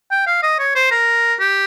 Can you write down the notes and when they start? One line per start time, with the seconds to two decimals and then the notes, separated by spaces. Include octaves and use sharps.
0.11 G5
0.27 F5
0.43 D#5
0.59 C#5
0.75 C5
0.91 A#4
1.39 G4